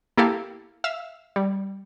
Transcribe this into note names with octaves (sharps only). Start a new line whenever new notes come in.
A#3 E4 G4 A4 F5
E5 F5 E6
G3